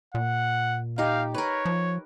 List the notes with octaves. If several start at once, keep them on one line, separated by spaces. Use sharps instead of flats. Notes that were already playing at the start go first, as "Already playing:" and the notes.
A#2 F#5
D#4 G4 F5
A#4 B4 C#5
F3